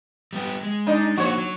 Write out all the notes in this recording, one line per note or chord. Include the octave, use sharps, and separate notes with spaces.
G3 B3 G4
G#3
D4 D#4
F3 A#3 F#4 C5 C#5
F#3